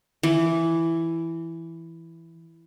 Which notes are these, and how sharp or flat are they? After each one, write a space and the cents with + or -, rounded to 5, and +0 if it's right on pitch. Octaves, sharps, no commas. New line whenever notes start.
E3 +5